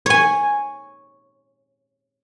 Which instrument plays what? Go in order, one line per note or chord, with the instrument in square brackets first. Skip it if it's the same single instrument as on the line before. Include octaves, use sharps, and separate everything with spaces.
[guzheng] C#5 G#5